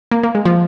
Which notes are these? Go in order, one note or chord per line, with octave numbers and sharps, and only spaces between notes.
A#3
A#3
G#3
F3